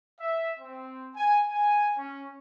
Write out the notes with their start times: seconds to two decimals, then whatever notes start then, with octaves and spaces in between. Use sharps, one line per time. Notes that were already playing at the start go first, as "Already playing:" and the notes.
0.20 E5
0.60 C4
1.17 G#5
1.49 G#5
1.97 C#4